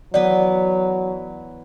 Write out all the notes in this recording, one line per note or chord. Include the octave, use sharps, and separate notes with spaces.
E3 F#3 B3 D5